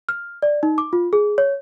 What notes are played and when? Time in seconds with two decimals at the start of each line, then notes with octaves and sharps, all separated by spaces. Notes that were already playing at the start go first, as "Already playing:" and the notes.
0.09 F6
0.42 D5
0.63 D#4
0.78 D6
0.93 F4
1.13 G#4
1.38 C#5